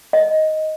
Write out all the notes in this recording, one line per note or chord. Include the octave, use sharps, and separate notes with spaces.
D#5